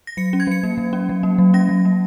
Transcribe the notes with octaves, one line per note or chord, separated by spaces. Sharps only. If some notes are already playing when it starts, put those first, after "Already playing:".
A#6
F#3 C#7
C#4
G#6
F#3 C#7
A#3
F#3
C#4
F#3
A#3
F#3
C#4 A#6
F#3
A#3